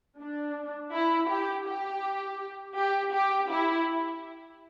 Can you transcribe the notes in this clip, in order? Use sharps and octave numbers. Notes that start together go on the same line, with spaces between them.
D4
E4
G4
G4
G4
G4
E4